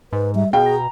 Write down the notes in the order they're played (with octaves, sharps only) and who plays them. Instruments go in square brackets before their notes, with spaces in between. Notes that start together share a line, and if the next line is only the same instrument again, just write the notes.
[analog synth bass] G#2 [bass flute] B4
[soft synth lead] G3 [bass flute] E5
[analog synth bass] B2 [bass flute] G#4 [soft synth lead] F5 [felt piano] G5
[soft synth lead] A#5